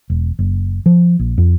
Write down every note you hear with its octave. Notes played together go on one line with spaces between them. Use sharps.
E1
F#1
F3
A#1
F2